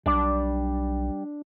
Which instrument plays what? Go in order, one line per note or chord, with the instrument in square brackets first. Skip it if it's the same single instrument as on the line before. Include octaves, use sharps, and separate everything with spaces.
[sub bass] B1 [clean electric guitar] G3 D5 [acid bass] D4